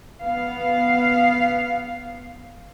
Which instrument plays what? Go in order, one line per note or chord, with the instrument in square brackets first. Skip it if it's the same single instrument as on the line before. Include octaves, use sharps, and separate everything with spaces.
[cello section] B3 F5